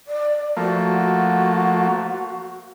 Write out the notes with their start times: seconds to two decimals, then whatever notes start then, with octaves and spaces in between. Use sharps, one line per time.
0.07 D5
0.57 F3 A3 A#3 F#4